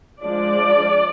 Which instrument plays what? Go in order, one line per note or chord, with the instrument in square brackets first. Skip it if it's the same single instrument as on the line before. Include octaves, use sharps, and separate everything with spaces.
[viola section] F3 G#3 D4 D5